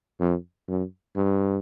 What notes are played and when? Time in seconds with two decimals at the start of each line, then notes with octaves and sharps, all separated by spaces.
0.20 F2
0.68 F#2
1.16 G2